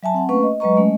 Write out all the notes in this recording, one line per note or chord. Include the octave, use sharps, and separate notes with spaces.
F#3 E5 G#5 A5
C4 F#5
A3 A#3 C#4 B4 F5 C#6
D#5
F#3 G#3 B4 D#5 A#5 C#6
G#3 A3 C#4 D#5